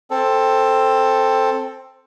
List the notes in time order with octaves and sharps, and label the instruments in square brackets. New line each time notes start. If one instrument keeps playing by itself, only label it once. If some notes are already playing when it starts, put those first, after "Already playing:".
[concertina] C4 A4